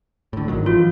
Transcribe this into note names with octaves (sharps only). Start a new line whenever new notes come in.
A2 D3
G#1 D#3 F#3
E3 F3 F4